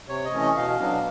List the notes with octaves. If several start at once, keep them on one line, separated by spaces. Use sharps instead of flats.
C3 C#5
D#5
E3 A3 C#4
D#5
B2 F5
F#3 B3 D4